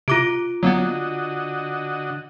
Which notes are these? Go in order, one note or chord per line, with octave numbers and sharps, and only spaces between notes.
C3 F4 D6 D7
D3 F#3 A#3 B3 F#4 D#5